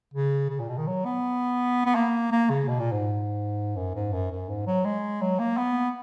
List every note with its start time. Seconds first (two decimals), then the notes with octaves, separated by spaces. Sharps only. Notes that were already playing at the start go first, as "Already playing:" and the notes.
0.14 C#3
0.50 C#3
0.59 A#2
0.69 B2
0.78 D#3
0.87 F#3
1.05 B3
1.86 B3
1.95 A#3
2.31 A#3
2.50 C#3
2.68 B2
2.80 A#2
2.92 G#2
3.76 F#2
3.95 G#2
4.13 F#2
4.31 F#2
4.49 G#2
4.67 F#3
4.84 G#3
5.21 F#3
5.39 A#3
5.57 B3